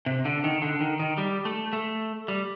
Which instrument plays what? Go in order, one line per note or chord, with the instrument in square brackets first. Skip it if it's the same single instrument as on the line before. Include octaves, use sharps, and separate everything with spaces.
[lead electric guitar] C3
D3
D#3
D3
D#3
D#3
G3
A3
A3
G3